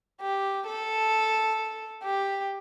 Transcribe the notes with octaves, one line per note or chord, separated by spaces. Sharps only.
G4
A4
G4